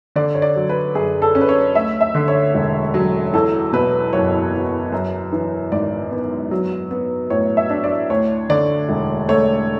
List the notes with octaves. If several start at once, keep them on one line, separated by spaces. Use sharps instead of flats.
D3 D5
C#5
D5
F#3
B4
F#2 G#4
A4
C#4
B4
C#5
D2 E5
E5
D3
C#5
E1
F#3
E2 A4
B2 B4
F#1 C#5
F#3
F#2
E3
G#1 D5
B3
F#3
B3
A2 C#5
E5
D4
D5
D2 C#5
D3 D5
E1
A3 C#5